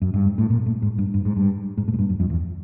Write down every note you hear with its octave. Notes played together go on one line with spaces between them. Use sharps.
F#2
G2
G#2
A2
A#2
A2
G#2
G2
G2
G#2
G2
G#2
A2
G#2
G2
F#2
F2
E2